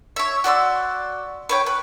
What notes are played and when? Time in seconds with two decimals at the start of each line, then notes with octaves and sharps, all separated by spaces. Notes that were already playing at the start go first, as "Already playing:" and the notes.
0.16 C#5 E5
0.44 F#4 D5 C6 E6
1.49 B4 C#5 G5
1.66 B4